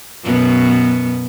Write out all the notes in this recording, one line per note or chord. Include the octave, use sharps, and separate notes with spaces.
F#2 B2 B3